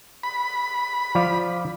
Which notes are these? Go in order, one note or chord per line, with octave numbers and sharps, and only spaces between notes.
B5
F3 D5 F5